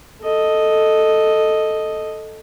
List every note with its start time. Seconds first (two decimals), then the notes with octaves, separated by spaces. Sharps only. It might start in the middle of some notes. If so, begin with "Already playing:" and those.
0.22 A4 D#5